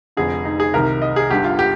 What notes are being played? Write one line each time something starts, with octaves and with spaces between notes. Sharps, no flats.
F1 F2 D3 G#4
D#4
G#4
C2 C3 D#3 A#4
D#5
G#4
G1 G2 D3 G4
F4
G4